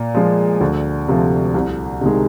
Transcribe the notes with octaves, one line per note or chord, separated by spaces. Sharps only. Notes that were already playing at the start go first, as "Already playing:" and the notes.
Already playing: A#2
F3 G#3
D2
C3 F3 A3
C2
C3 D#3 G#3